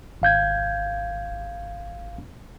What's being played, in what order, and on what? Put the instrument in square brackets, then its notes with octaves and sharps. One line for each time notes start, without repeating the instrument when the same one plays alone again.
[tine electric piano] G#1 F5 G6 G#6